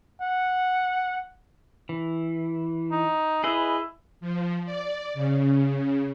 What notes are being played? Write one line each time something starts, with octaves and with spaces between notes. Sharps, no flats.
F#5
E3
D#4
E4 G#4 B4 D#5
F3
D5
C#3